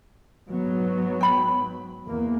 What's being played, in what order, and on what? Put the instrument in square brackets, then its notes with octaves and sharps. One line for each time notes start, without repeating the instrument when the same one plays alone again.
[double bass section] G#2 F#3 B3
[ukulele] G5 B5
[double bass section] E2 A#3